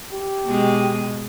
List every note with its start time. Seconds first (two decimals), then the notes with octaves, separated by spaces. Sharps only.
0.12 G4
0.45 B2 G#3